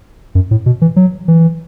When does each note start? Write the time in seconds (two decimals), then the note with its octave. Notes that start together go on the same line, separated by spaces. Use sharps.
0.35 F#2
0.51 A2
0.66 B2
0.81 E3
0.96 F#3
1.28 E3